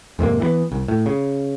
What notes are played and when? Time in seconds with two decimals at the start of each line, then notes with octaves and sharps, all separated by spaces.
0.19 F2 G#2 C3 A#3
0.40 E3 G3 B3
0.72 C2
0.88 A2
1.06 C#3